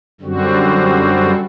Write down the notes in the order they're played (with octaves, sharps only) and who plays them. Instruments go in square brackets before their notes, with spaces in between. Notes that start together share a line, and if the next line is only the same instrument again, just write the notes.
[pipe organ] F#2 D3 G3 C4 F#4